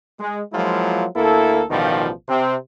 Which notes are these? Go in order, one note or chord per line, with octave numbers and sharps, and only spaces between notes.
G#3
F3 F#3 G#3 A#3 E4 F4
D2 A#3 E4 A4
A1 B2 D#3 F3 G3 F4
C3 C4